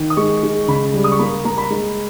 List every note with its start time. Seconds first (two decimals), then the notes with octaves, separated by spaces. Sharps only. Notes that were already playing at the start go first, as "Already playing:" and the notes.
Already playing: D#3
0.10 D#6
0.17 G#3 C#6
0.43 G#3
0.68 C#3 B5
0.94 G3
1.04 D#6
1.12 C#6
1.19 A#3 B5
1.45 A#3 A#5
1.58 B5
1.70 G#3